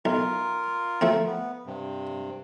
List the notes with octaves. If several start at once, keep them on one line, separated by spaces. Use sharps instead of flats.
B1 F4 A#4
F3 A3 C4
B3
G2 C3